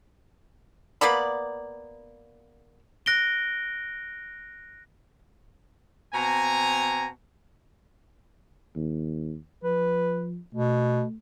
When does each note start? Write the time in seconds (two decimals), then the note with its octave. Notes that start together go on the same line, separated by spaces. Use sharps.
1.01 A#3 B3 D5 B5
3.06 F#6 A#6 D7 G7
6.14 B2 C4 G#5 A#5
8.76 D#2
9.64 F3 B4
10.54 B2 A3